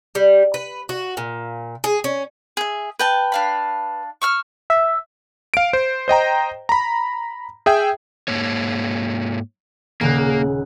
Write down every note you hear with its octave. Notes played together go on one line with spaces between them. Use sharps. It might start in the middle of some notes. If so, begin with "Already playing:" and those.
G3
B4
F#4
A#2
G#4
C#4
G#4 E5
B4 G5 A5
D4 F5 B5
C#6 E6 F6
E5
F5 D7
C5
C5 D#5 G5 A#5
A#5 B5
G#4 E5 G5
G#2 A#3 C#5
D#1 C#3 A#3 F#6